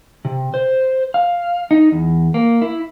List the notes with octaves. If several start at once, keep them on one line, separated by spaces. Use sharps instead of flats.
C3
C5
F5
D#4
E2
A#3
E4